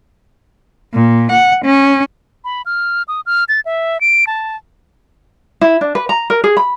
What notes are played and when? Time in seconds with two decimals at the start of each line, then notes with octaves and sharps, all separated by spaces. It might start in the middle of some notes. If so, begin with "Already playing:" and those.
0.94 A#2
1.32 F#5
1.65 C#4
2.45 B5
2.66 F6
3.08 D#6
3.26 F6
3.49 A6
3.65 E5
4.01 D7
4.27 A5
5.61 E4
5.81 D4
5.95 B4
6.09 A#5
6.30 A#4
6.44 G#4
6.57 B5